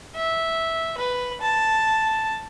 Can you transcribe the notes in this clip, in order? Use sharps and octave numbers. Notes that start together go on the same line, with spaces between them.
E5
B4
A5